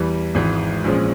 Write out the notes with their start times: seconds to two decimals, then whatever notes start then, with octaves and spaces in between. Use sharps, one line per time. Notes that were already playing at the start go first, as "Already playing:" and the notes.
Already playing: E2 E3 G3
0.35 G#1 G#2 E3
0.84 A#1 A#2 F3 G#3 C#4